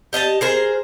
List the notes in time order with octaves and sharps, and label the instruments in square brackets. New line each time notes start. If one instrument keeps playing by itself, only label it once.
[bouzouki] G4 D#5 G#5 A5
G#4 A#4 C5